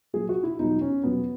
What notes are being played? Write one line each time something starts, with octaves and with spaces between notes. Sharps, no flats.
A#2 F#3 G#4
F#4
E4
E2 B2 F#3 D#4
C#4
E2 B2 F#3 B3